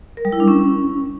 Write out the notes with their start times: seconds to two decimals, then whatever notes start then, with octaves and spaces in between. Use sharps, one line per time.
0.17 A#4
0.25 G3
0.32 E4
0.40 D4
0.48 C#4